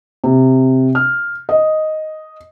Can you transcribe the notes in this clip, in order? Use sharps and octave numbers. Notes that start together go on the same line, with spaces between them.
C3
F6
D#5